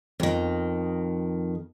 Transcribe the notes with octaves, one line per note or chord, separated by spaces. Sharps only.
F2 D#3